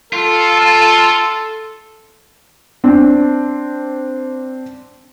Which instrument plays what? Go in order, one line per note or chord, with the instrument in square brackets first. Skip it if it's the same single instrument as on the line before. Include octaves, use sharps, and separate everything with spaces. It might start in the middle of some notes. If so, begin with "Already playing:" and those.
[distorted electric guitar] F4 [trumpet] A4
[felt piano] C4 D4